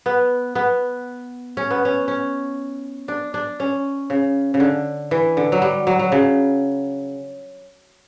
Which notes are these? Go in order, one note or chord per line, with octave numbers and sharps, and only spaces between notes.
B3
B3
C#4
B3
C#4
C#4
D4
D4
C#4
C#3
C#3
D3
E3
D3
F#3
G3
F#3
F#3
C#3